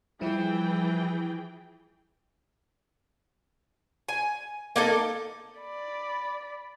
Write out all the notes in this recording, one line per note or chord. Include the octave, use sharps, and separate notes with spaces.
E3 F3 G3 E4 G#4 G5
G#5
A#3 D#4 A4
D5 B5